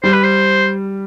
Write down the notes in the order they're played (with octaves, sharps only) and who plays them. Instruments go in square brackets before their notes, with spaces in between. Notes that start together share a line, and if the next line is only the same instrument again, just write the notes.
[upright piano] G3 [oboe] C5
[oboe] B4
C5